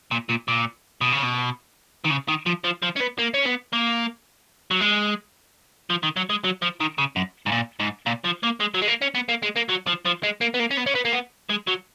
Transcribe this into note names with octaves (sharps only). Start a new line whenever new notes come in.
A#2
A#2
A#2
B2
C#3
B2
D#3
C#3
D#3
F3
F3
F3
C#4
B3
A#3
C#4
B3
A#3
F#3
G#3
F3
D#3
F#3
G#3
F#3
F3
D#3
C#3
F#2
G#2
A#2
G#2
A#2
F3
A#3
G#3
F#3
G#3
A#3
C#4
B3
A#3
G#3
A#3
F#3
F3
F3
G#3
A#3
B3
A#3
C#4
B3
C#4
B3
A#3
B3
G#3
F#3